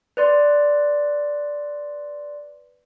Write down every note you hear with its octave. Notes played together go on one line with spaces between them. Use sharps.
B4 D5 C6